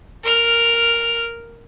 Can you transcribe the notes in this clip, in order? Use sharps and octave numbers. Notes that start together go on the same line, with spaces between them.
A#4 F6